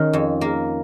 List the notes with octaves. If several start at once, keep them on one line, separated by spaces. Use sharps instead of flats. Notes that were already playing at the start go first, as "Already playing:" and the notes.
Already playing: D#3 C#4
F2
A#3